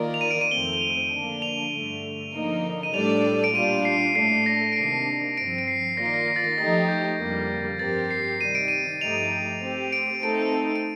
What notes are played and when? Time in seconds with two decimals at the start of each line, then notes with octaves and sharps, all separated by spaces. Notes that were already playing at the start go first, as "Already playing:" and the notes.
Already playing: D#3 A#3 F4 A#4 D5
0.14 F7
0.21 D#7
0.31 D7
0.41 D#7
0.51 F2 D#3 A3 C4 G7
0.73 G7
0.81 F7
1.12 D3 F3 A#3 D4
1.42 F7
1.72 G2 D3 A3
2.34 D3 F3 A#3 D#4 A#4
2.83 D#7
2.94 A2 G3 D4 A4 D5 F7
3.44 D7
3.54 A#2 G3 D4 F4 D#7
3.85 C7
4.15 A2 A3 D4 A4 C7
4.46 A#6
4.72 D7
4.76 C3 D#3 A#3 D4 C7
5.37 G2 F3 C4 D7
5.58 D7
5.68 C7
5.97 D#3 A#3 F4 A#4 D5 A#6
6.06 C7
6.14 A#6
6.28 A#6
6.36 A6
6.44 A#6
6.58 F3 A3 D#4 G4 A6
6.88 G6
7.19 F2 D3 G3 A#3
7.79 G2 F3 C4 G4 A#4 A6
8.11 C7
8.40 C3 D#3 G3 D#7
8.55 D7
8.68 D#7
9.01 G2 F3 A3 D#4 G4 F7
9.62 A3 C4 G4
9.93 D7
10.23 A3 C4 D#4 A4 D7
10.75 D7